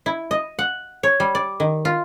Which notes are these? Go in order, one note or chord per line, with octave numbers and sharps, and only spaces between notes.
E4
D#5
F#5
C#5
G3
D5
D#3
F4